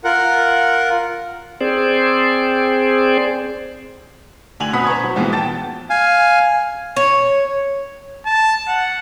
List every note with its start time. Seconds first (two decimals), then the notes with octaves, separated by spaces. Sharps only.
0.04 F4 A#4 F#5
1.61 C4 G#4 C5 D5
4.60 D2 D3 G#5 F7 F#7
4.73 B2 C4 F#5 B5 D#6 B6
4.85 C5 A#5 C#6 G#6
5.04 F#3
5.16 D#2 G#2 B2 E3 F3 B3
5.32 G5 A5 A6
5.90 F5 G#5
6.96 C#5
8.26 A5
8.68 F#5